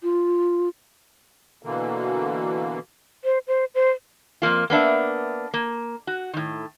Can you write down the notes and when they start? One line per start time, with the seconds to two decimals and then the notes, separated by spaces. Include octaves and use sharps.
0.03 F4
1.63 B2 D3 E3 A#3
3.25 C5
3.48 C5
3.75 C5
4.42 F2 B2 A#3 F4
4.70 A#3 B3 D4 E5
5.54 A#3
6.07 F#4
6.33 A2 D#3